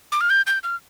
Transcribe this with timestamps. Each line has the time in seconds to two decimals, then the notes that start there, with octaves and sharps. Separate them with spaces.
0.12 D6
0.21 F6
0.30 G6
0.47 G6
0.64 F6